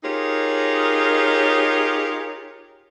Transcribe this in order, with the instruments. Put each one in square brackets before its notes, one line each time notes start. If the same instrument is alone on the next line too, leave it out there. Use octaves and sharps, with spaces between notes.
[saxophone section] D#4 F4 G4 G#4 A#4 C#5